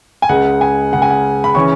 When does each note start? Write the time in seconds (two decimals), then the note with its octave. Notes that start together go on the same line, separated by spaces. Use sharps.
0.22 G#5
0.29 C#2 C#3 G#3 F#5
0.61 G#5
0.92 C#2 C#3 G#3 F#5
1.02 G#5
1.10 F#5
1.44 B5
1.55 C#3 E3 C#4 C#6